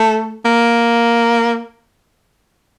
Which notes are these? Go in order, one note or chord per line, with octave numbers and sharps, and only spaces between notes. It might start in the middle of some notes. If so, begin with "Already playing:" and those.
Already playing: A3
A#3